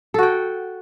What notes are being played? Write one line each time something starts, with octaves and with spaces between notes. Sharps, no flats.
F#4 A4 G5